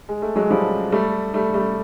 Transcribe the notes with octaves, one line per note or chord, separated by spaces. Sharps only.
G#3
A3
F#3 G#3
F3 G3
G3 A3
G3 A3
G3 A3